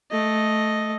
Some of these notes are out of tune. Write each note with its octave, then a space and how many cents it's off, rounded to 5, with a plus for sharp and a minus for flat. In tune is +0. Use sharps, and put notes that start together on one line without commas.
A3 -10 D#5 +0